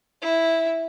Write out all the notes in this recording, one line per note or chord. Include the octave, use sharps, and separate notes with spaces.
E4